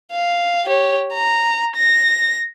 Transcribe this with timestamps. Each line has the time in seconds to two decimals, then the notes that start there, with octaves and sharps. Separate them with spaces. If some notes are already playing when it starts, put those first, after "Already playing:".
0.12 F5
0.65 G4 C#5
1.13 A#5
1.76 A#6